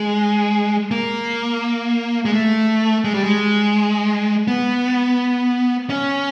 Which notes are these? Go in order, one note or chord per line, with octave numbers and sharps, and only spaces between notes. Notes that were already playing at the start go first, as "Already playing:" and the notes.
Already playing: G#3
A#3
G#3
A3
G#3
G3
G#3
B3
C#4